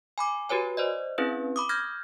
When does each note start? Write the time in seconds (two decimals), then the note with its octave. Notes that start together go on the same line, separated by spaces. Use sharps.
0.18 G#5 B5 D6
0.49 F#4 G4 B4 C#5 G#5
0.77 C5 D5 D#5
1.18 C4 C#4 E4 G#4 B4
1.56 B5 D6 D#6
1.69 F6 G6 G#6 A#6